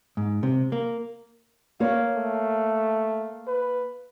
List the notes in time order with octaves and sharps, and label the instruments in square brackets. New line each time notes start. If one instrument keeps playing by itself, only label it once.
[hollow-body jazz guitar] G#2
C3
A#3
[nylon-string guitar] A#3 A#4 C#5 [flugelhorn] F5
[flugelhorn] A3
B4